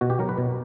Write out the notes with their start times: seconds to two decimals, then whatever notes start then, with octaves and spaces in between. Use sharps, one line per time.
0.01 B2 F#4
0.10 G4
0.19 F#3 A#4
0.29 B4
0.38 B2